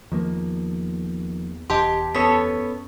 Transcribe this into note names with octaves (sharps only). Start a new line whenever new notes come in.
E2 D#3 F3 A#3
F1 E2 G4 D#5 A5 C6
F#2 B3 A4 C#5 B6